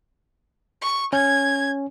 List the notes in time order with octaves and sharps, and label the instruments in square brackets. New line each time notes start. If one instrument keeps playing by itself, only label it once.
[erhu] C#6
[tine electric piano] C#4 [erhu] G#6